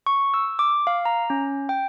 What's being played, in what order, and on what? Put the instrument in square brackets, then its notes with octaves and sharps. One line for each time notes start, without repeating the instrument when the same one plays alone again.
[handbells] C#6
E6
D6
F5
A#5
C#4
G5